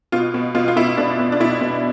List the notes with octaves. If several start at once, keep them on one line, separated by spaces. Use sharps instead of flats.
B2 F4
B2
B2 F4
F4
B2 E4
B2 D4
B2
D4
B2 E4
B2